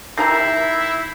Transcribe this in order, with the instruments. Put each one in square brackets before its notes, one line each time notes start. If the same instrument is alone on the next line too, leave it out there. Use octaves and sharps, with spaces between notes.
[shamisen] D#3 G4 A#5 [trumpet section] E4 [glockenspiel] G6 A#6 C7